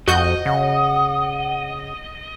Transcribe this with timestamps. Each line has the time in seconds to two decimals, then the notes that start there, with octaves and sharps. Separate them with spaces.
0.08 F2 F#4 D#5 G6
0.46 C#3 F#5